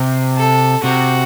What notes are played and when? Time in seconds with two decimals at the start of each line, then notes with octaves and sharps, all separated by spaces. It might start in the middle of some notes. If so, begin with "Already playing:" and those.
Already playing: C3
0.37 A4
0.83 C3 F#4